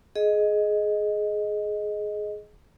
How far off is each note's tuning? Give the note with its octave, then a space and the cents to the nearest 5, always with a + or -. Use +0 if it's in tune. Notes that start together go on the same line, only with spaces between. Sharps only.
G#4 +20 D#5 +0